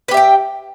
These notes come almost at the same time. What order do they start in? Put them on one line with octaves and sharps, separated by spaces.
B4 G4 E5 G5